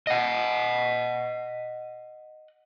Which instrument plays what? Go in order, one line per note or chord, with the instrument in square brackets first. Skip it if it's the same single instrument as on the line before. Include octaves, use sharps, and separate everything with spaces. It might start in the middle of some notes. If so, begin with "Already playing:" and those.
[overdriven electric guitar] D#5 F#5